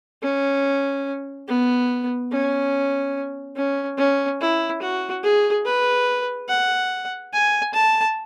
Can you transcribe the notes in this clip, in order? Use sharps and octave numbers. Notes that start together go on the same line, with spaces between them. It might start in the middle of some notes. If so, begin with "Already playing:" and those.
C#4
B3
C#4
C#4
C#4
E4
F#4
G#4
B4
F#5
G#5
A5